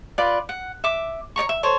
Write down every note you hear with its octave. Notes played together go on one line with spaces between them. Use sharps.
F4 B4 D5 B5
F#5
E5 D6
C#5 D5 A#5 C#6
E5
A4 C5 C#5